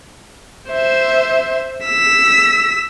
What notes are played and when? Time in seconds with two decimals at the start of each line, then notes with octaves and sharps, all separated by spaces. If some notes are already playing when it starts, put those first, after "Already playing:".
0.71 C5 E5
1.85 E6 B6